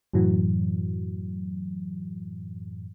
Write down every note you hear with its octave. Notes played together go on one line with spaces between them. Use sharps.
F#2 A2 E3 F#3